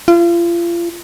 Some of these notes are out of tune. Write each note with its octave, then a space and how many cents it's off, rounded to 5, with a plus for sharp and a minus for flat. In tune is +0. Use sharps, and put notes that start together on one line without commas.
F4 -35